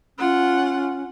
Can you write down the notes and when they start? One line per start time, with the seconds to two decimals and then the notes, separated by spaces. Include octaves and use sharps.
0.18 C#4 F4 F#5